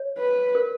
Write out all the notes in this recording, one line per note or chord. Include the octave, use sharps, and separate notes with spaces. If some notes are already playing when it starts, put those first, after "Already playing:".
Already playing: C#5
B4
A#4